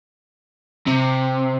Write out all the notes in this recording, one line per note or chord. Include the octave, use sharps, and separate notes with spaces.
C3